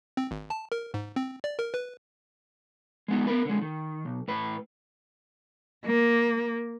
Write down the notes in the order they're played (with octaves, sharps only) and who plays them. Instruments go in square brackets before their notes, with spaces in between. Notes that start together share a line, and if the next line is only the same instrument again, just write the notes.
[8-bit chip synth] C4
G#1
A5
A#4
G#2
C4
D5
A#4
B4
[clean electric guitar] G#3 B3 D#4
B3 A#4 B4
D3 G#3
D#3
B1
A2 B4
[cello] A#3